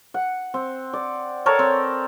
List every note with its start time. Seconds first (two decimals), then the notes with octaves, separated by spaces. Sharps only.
0.14 F#5
0.54 C4
0.93 D5
1.46 A4 A#4 C#5 A5
1.59 C4